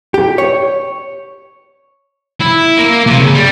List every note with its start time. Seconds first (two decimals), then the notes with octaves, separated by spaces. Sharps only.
0.14 G4
0.38 C#5
2.40 E4
2.77 A#3
3.06 C3
3.19 C#3
3.34 G3